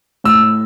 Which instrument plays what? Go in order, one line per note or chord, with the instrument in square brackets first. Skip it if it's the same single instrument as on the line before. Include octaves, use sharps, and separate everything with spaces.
[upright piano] A2 [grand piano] E6